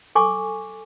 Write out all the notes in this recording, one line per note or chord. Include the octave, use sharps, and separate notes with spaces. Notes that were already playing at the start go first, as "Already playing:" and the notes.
A4 G#5 C#6 D6